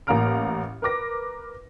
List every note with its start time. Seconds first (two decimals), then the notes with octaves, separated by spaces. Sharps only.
0.07 A1 A#3 F5 A#5 F6 D7
0.82 A#4 B4 D6 A#6